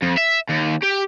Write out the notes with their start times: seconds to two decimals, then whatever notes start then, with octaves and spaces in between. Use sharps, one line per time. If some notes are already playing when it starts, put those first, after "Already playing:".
0.03 F2
0.18 E5
0.49 D#2
0.82 G4